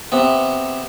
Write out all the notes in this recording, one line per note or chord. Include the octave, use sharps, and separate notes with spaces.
C3 B3